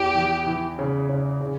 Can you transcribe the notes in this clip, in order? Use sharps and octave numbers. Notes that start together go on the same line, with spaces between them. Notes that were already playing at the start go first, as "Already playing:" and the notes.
Already playing: E2 E3 G4
E3
E3
C#3
C#3
C#3